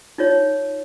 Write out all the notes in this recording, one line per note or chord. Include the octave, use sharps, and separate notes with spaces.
D#4 F4 C#5